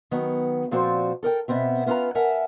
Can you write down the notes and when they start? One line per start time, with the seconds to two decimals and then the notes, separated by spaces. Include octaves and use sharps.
0.11 D#3 F#3 B3
0.71 A#2 F3 C4 F#4 C5 D5
1.23 A4 A#4 D5 G5
1.48 B2 B3 C4 E5
1.86 B3 C#4 F4 G#4 B4 A#5
2.15 A#4 E5 F#5 G#5 A5